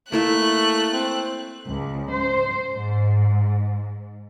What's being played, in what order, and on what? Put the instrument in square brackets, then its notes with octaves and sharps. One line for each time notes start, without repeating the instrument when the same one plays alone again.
[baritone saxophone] A3 [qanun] A#3 E4 E5 [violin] F#6
[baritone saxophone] C4
[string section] C#2
C5
G#2